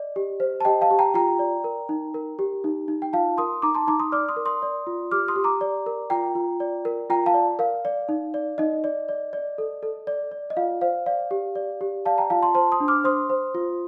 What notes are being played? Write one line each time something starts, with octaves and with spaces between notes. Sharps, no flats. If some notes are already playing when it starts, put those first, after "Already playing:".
Already playing: D5 D#5
G4
C5
A5
G4 D#5 G5
F5 A5
G4
G5 A#5
F4 G5 A#5
D5
A#4
D#4
A#4
G4
D#4
D#4
G5
F4 F5 A5
A#4 C6 D#6
D#4 A#5 D6
A5 C6
D#4 A#5 D6
C6 D#6
D5 D6 F6
C6 D#6
A#4
C6 D#6
D5
F4
G4 D6 F6
C6 D#6
G4
A#5 D6
D5
A#4
F4 G5 A#5
F4
D5
A#4
F4 G5 A#5
F5 A5
D5
A#4 F5
D5
D#4
D5
D#4 D#5
D5
D5
D5
A4
A4
D5
D5
D#5
F4 F5
C5 F5
D5 F5
G4
D5
G4
D5 F5 A5
G5 A#5
F4 F5 A5
A5 C6
C5 A5 C6
C6 D#6
D4
D6 F6
C5 C6 D#6
C5
F4